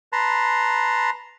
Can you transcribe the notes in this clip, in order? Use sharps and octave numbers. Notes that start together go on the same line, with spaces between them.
B4 A5 A#5 C6